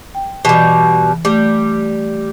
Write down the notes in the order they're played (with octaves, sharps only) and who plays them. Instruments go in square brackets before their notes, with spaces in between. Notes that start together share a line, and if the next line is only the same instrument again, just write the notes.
[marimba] G5
[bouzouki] B2 G3 [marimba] E3
[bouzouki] G3 [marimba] A3